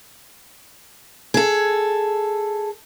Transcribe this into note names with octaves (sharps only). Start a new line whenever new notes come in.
G#4 A4